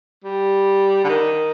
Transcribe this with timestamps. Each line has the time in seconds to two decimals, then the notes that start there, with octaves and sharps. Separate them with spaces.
0.24 G3
1.04 D3
1.09 D#3